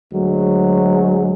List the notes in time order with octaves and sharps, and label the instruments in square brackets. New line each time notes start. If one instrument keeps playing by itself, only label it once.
[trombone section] D2 F#3 G#3